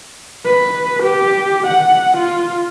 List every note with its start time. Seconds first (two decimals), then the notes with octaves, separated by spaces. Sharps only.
0.45 B4
1.03 G4
1.67 F#5
2.17 F4